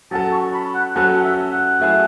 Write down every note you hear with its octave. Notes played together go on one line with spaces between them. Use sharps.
F#3 C#4 F#4 A4 A5
C#6
B5
F#5
F#3 C#4 F#4 A4 F#5
E5
F#5
F#3 A3 E4 G#4